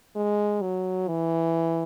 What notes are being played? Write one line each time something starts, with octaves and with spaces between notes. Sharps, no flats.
G#3
F#3
E3